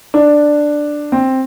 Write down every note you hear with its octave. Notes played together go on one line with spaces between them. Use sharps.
D4
C4